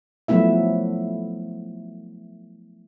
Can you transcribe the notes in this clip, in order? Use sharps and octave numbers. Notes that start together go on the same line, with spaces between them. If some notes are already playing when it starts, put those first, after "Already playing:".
F3 F#3 A3 B3 E4 E5